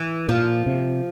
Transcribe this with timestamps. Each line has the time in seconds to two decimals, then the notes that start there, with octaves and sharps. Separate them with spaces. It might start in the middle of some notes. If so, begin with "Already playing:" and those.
Already playing: E3
0.28 A#2 F3
0.66 C3